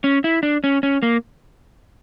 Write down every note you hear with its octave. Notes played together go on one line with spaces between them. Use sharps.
C#4
E4
D4
C#4
C#4
A#3